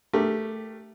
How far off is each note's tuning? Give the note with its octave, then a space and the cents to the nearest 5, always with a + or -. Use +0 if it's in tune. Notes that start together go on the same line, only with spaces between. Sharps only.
A3 +0 G4 +0 A#4 -10